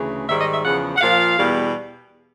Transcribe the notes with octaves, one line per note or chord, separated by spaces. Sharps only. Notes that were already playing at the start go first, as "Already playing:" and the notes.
Already playing: D2 C#3 E3
G#2 D#3 G3 E5
D#5
E5
E2 C#3 F3 F#5
F#5
A#2 F3 F5
E2 B2 G3